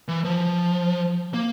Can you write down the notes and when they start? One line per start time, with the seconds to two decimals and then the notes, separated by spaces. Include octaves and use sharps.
0.08 E3
0.25 F3
1.34 A#3